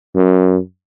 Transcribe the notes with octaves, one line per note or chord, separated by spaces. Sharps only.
F#2